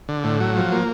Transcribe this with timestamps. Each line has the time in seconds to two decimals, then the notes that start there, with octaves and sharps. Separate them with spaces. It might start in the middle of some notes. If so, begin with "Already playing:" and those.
0.09 D3
0.24 A2
0.40 F#3
0.57 F3
0.72 A#3